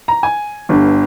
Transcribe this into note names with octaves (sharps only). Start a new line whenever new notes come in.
A#5
G#5
G1 G2 D3